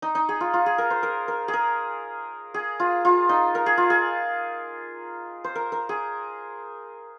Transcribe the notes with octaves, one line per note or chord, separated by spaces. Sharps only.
D#4
D#4
G#4
F4
F4
G#4
A#4
C5
A#4
A#4
G#4
A#4
G#4
F4
F4
D#4
A#4
G#4
F4
G#4
C5
A#4
A#4
G#4